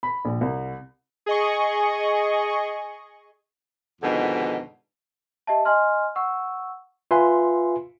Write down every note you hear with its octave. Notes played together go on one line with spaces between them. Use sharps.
B5
A#1
C2
G#4 D#5 C#6
F2 G#2 B2 D3 D#3
G4 D#5 E5 A5
D#5 G#5 C6 F6
F#5 C#6 E6
F4 B4 E5 G#5 C6